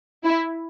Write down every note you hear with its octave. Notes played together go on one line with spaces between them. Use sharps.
E4